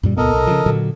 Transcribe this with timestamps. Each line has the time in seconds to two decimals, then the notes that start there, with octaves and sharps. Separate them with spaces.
0.03 F#2 A#2 G3
0.17 C#2 A#2 B3 A4 A#4 D#5
0.33 B1
0.47 C#3 F3
0.66 A#2 D3 F#3